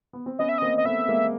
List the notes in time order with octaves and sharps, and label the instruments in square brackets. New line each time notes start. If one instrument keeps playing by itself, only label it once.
[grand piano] B3
C4
[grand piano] B3 C#4 [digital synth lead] D#5
[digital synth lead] E5
[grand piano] A#3 C4 [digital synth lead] D#5
[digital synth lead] D#5
[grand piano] A3 B3 [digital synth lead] E5
[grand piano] G#3 A#3